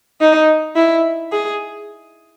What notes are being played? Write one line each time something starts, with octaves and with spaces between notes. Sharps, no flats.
D#4
E4
G#4